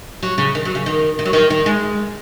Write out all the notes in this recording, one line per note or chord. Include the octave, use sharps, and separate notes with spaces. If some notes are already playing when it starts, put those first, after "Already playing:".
F#3
C#3
D#3
F#3
C#3
D#3
D#3
F#3
D#3
D#3
G#3